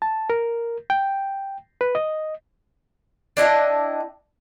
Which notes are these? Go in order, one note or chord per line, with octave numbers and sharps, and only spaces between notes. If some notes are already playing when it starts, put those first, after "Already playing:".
A5
A#4
G5
B4
D#5
D4 E4 D#5 G5